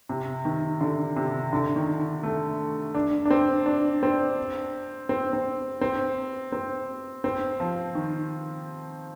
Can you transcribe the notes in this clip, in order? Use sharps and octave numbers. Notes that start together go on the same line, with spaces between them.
C3
D#3
D3
C3
D3
D#3
A3
D4
D4
C4
D4
C4
C4
C4
C4
C4
C4
F3
D#3